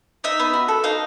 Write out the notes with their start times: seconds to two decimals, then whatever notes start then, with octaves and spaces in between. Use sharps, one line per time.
0.24 D#4 E5
0.39 B3
0.53 F#4
0.68 A4
0.84 D#4 F5